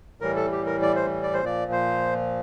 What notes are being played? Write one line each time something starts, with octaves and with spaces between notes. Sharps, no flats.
A2 E3 G3 A#4
A4
G4
A#4
D5
C5
D5
C5
A#2 F3 D5
C5